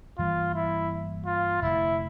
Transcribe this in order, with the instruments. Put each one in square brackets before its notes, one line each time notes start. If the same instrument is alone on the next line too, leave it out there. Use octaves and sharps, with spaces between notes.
[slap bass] G2 E3 G3 A#3 [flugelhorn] F4
[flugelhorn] E4
F4
[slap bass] F1 F2 D3 A3 [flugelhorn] E4